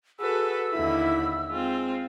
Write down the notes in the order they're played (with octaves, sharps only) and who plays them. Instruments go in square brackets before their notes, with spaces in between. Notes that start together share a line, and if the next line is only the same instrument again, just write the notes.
[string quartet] F#4 A4 B4 [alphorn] G#4 [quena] E6
[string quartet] D#2 D3 B5 [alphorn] E4
[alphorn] G#3 [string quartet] C4 F4